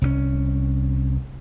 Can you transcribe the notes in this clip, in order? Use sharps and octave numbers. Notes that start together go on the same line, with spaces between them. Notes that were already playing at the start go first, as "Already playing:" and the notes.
C2 F#3 C#4